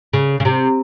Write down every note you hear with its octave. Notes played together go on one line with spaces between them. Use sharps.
C#3
C#3
C3